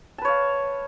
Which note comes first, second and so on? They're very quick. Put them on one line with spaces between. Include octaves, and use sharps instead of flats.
A5 B4 C#5 F5